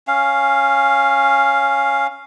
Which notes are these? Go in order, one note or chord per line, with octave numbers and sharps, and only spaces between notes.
C#4 F5